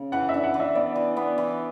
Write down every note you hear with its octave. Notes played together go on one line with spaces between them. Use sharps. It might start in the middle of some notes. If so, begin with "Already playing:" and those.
Already playing: C#3
E3 F#5
E5
D4
F#5
E3
E5
B3 D5
E3
B3
E3